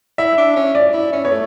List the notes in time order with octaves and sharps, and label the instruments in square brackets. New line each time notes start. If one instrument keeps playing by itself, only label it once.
[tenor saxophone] E4 [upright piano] E5
[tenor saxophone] D4
C#4
[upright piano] D5
[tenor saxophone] E4
C#4
[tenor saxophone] B3 [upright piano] C#5
[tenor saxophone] A3